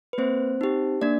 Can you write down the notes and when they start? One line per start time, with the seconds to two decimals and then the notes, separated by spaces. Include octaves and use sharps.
0.13 B4
0.18 A#3 C4 C5
0.61 D#4 G4
1.01 A#3 D4 D5